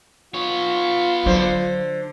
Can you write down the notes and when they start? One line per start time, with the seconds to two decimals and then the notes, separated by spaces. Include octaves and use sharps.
0.34 B3 F4 C#5
1.26 D3 F#3 C5